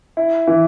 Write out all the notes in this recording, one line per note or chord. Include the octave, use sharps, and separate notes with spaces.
E4
E3